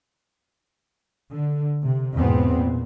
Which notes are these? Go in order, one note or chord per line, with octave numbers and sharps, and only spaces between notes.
D3
C3
E2 G#2 B2 B3 C4
A#2